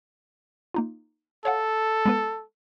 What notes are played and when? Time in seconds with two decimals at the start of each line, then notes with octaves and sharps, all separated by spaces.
0.74 A#3 D#4 F4
1.45 A4 C#5 F5 F#5
2.06 G#3 B3 B4